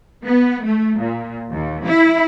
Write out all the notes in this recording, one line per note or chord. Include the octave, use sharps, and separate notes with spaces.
B3
A3
A#2
D#2
E4